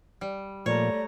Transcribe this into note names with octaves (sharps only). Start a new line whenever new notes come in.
G3
A#2 F3 A3 C#5 D5 A#5